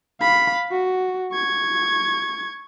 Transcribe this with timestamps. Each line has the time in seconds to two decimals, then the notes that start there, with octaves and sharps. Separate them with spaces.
0.21 F5 B5
0.71 F#4
1.32 C#6 G#6